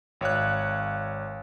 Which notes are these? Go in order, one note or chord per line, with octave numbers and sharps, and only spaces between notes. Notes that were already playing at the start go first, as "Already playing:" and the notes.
G#1 C#5 F5 F#6